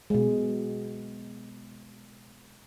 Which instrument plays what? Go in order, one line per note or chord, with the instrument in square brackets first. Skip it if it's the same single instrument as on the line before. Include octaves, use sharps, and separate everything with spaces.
[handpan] B2 G#3